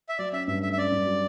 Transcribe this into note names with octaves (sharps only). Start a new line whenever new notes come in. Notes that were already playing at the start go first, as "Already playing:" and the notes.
E5
F#3 D5
C#4 E5
G2 E5
A3 E5
E5
C#4 D5
G2
F#3